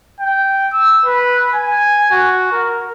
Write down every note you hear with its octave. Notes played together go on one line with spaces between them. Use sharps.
G5
E6
B4
G#5
F#4
A#4